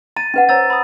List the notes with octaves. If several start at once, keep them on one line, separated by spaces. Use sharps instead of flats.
A#5 A6 D#7
C#4 B4 F#5
C5 C#5 A#5 E6 A6
B5 D#6